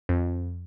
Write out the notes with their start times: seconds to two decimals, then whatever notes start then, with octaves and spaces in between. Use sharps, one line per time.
0.09 F2